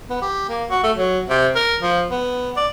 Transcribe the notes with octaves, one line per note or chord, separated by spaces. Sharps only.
B3
G4
A#3
F#4
A3
F#3
C3
A#4
F3
B3
D5